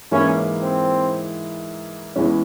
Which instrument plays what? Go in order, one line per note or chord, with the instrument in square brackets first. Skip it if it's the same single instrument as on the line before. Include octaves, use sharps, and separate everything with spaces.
[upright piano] G#2 E3 A#3 E4 [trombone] C#4
[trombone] C4
[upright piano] E2 E3 G#3 C#4